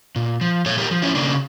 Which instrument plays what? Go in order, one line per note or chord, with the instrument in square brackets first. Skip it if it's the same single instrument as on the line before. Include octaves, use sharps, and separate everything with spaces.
[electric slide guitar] A#2
F3
A#2 A4 C#5
G4 A#4
F3
C#4 E4
C#3 A#3 D4